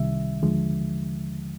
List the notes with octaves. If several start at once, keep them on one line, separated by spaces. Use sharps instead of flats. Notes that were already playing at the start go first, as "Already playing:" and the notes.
Already playing: C2 C3 D#3 G3 E5
D#2 D3 F3 G#3